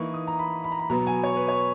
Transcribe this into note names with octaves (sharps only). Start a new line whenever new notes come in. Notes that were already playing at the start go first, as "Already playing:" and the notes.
Already playing: E3 A#3 D#4 C#6
D#6
A#5
B5
B5
A#5
B5
B2 F#3 B3 A#5
G#5
C#5
B4
C#5